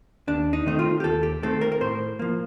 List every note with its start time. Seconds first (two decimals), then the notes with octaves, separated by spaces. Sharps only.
0.27 D#2 D4
0.53 D#4
0.66 D#3 A3 C4 D#4
0.79 F4
1.00 G4
1.04 D#2 A4
1.23 G4
1.42 D#3 A3 C4 A4
1.61 A#4
1.72 A#4
1.81 A2 C5
2.19 F3 A#3